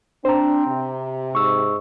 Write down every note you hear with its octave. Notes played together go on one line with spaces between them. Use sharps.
C4 D4 C5 A#5
C3
G#2 C#6 E6